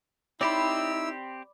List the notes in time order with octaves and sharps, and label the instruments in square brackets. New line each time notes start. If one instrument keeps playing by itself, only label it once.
[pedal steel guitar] C4 G4 C5 [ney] D#4 [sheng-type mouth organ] E4 E6 [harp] D5 B5